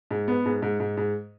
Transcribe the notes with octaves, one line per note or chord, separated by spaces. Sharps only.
G#2
B3
G#2
G#2
G#2
G#2